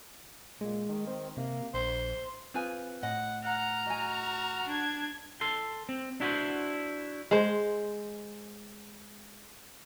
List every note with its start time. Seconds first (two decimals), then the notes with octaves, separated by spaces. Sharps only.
0.61 A#2 G#3
0.89 D#3
1.07 C4
1.37 C3 A#3
1.74 A#1 C5
2.54 C4 F4 G#4 B4 G#5
3.03 A2 D#5 F#5
3.44 F#5 A#5 F6
3.86 F#4 D#5 G#5
4.67 D4 G#6
5.41 A4 C6
5.89 C4
6.20 D4 E4 F#4 G#4 B4 C5
7.31 G#3 C5